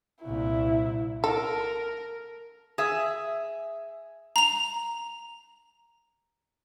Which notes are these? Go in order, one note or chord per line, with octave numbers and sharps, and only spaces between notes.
C2 A#2 E4
A4 A#4
G#4 E5
A#5 F7